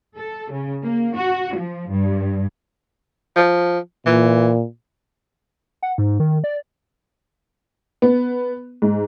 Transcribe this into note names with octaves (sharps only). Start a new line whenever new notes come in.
A4
C#3
A#3
F#4
F3
G2
F3
A#2 E3
F#5
G#2
D#3
D5
B3
G#2